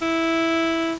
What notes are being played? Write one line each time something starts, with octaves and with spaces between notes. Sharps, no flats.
E4